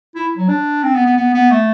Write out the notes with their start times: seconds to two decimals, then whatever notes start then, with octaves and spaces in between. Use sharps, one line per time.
0.15 E4
0.37 F#3
0.48 D4
0.83 C4
0.94 B3
1.05 B3
1.17 B3
1.34 B3
1.50 A3